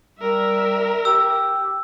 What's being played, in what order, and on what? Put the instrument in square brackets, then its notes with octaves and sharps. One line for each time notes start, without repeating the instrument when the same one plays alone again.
[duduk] G3 [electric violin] A#4 E5
[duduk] G4 [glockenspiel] E6